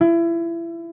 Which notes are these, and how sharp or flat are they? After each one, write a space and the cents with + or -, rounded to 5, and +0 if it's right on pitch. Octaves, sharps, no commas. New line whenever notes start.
E4 +30